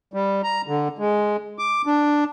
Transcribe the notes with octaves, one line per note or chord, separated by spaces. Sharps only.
G3
A#5
D3
G#3
D6
D4